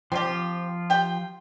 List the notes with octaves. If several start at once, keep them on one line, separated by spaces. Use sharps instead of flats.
F3 C4 F4 G4
G4 G5